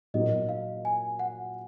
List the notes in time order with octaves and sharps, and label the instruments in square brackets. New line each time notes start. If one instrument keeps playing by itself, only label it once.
[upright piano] A#2 F#3 A#3 D#4 F#4 [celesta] D#5
[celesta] F5
G#5
F#5